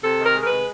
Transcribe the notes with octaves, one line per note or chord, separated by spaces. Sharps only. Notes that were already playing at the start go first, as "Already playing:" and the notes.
C3 A4
D#3
A#4
G#3
A#4
B4
C3